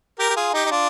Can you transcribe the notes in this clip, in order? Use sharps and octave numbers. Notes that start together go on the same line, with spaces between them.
G4 A#4
G4
F4 G#4
D#4 G4
D#4
D4 F4